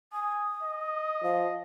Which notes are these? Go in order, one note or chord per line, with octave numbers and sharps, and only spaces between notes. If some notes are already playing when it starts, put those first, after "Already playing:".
G#5 D#6
D#5
F3 F5